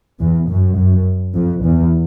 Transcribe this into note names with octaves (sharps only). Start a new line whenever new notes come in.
E2
F#2
F#2
F2
E2